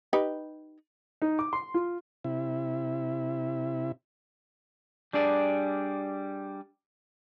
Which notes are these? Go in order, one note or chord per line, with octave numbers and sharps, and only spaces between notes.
D#4 G4 B4
D#4
D6
C6
F4
C3 E4
G3 D4 G#4 D5